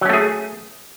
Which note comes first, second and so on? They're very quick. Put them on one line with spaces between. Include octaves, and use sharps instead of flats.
F#3 C#4 A3 G#4